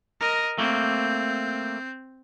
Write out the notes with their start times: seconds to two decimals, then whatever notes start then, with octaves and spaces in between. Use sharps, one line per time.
0.20 A#4 D#5
0.58 A3 A#3 C4 G6